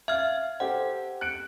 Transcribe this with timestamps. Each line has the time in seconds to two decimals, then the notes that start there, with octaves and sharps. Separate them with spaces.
0.08 E5 F5 F6 G#6
0.60 G4 A4 C5 F#5
1.21 F#6 C#7 D7